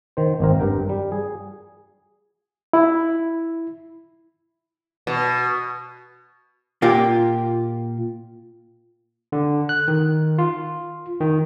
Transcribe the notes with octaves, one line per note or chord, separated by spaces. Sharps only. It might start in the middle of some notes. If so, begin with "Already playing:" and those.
D#3 C5
G#1 C4 A#4
G2 A#4 G5
G3
G#4
E4
B2
A#2 A#3 F4 G4
D3
F#6
D#3
F4
D#3